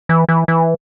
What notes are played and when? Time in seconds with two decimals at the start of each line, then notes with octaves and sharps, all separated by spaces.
0.09 E3
0.29 E3
0.48 E3